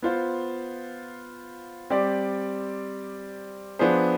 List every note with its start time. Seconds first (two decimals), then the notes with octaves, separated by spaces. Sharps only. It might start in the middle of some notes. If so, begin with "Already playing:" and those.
0.02 B3 F4 C5
1.90 G3 C4 G4 D5
3.79 F3 B3 D4 G#4 C5